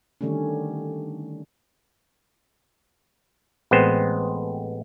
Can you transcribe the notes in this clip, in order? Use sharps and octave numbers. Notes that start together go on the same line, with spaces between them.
D3 D#3 G3 A3 C#4
A1 G#3 B3 C4 C5